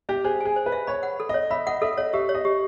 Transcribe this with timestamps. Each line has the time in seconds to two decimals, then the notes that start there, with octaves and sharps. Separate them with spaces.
0.09 G4 E5
0.24 G#4 C5
0.41 G#4 G#5
0.56 C5
0.66 B4
0.72 E5
0.87 C#5 B5
1.03 F#5
1.20 A4
1.29 C#5 D#5
1.51 E5 B5
1.67 D#5 F#5
1.82 A4 E5
1.98 C#5 D#5
2.13 G4 E5
2.29 C#5
2.35 D#5
2.45 G4